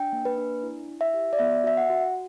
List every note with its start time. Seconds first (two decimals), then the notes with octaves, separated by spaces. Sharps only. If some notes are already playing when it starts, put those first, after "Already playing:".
Already playing: D4 G5
0.13 A#3
0.25 B4
0.38 D4
0.63 E4
0.88 E4
1.01 E5
1.14 G4
1.33 D5
1.39 B3 E5
1.64 F#4 E5
1.77 F#5
1.90 F#4